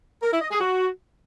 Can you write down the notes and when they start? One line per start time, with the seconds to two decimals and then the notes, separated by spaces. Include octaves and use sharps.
0.22 A#4
0.32 E4
0.41 D#5
0.51 G#4
0.60 F#4